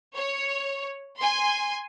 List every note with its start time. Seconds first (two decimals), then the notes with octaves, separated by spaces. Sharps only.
0.16 C#5
1.19 G#5 C6